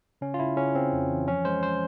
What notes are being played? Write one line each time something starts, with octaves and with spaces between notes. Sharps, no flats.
C#3 C#4
F4
C#3 E4
C#3 C#4
C#3 C4
F2
E3
F3 C#4
G#3 C5
C5